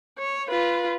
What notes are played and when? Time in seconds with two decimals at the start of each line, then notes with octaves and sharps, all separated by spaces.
0.19 C#5
0.49 F4 B4